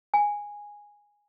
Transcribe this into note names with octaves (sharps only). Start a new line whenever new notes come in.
G#5